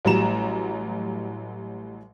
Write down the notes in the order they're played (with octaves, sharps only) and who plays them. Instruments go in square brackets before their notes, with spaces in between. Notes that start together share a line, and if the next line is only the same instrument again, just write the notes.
[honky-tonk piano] A1 A2 F#3 G3 A#5 E7